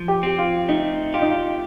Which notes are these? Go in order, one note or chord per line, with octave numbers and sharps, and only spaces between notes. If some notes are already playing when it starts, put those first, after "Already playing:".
Already playing: F3
G4
C4 G4
F4
A3 D#4
F4 G4
D#4
F4